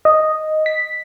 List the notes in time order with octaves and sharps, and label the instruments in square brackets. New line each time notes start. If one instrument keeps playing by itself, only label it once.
[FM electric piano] D#5
B6